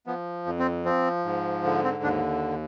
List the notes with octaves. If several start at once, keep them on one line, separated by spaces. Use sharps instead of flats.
F3 B3
F2
C4
F3 C4
G#2
D3
C4
D#2 D4